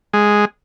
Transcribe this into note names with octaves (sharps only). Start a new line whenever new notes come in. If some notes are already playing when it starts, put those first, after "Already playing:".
G#3